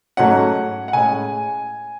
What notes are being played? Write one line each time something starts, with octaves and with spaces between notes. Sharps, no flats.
G#2 F#3 A3 C#4 F#5
F#5
A2 G#3 C#4 G#5